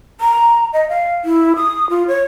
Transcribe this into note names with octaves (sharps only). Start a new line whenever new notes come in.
A#5
D#5
F5
E4
D#6
F4
C#5